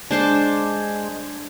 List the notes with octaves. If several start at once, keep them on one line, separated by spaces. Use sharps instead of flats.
G#3 D4 C5 A5